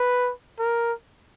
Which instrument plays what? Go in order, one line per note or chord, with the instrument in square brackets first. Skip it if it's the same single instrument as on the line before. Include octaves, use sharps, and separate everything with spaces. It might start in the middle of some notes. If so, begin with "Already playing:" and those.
Already playing: [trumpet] B4
A#4